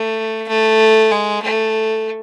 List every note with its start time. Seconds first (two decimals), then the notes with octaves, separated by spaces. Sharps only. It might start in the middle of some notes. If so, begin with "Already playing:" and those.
Already playing: A3
0.48 A3
1.11 G#3
1.43 A3